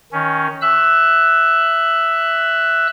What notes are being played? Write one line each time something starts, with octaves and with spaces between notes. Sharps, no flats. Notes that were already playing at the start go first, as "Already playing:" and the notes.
D#3 C#4
E5 E6 F#6